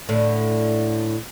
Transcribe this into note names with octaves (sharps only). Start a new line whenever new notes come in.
A2 D3